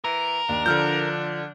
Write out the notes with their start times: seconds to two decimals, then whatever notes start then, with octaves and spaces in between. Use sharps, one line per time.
0.04 E3 A#4
0.49 D#2 D4
0.66 D3 F3 F6 G6